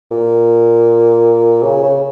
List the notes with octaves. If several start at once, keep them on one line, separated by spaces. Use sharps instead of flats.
A#2
C#3
C#3